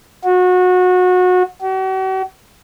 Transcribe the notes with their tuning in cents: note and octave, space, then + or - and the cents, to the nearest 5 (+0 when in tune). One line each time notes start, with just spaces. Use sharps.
F#4 -25
F#4 +45